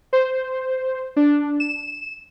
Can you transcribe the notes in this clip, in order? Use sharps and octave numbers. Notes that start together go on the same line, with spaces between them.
C5
D4
E7